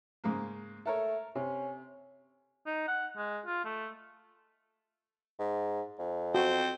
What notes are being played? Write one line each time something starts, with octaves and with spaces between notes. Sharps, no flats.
G#2 C#3 A#3
A3 A4 A#4 C#5
C3 C#4
D#4
F#5
G#3
F4
A3
G#2
F2
C4 F#4